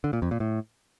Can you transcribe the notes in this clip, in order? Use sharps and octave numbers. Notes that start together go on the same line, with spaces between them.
D3
A#2
F2
A#2
A2